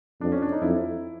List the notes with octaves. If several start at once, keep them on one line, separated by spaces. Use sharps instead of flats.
F2 D4
C#4
D4
D#4
F2 E4